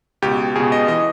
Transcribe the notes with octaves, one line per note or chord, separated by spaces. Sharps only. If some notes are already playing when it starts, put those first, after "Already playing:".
C#2 B2 G4
C#2 B2 G#4
D#5
E3 D#5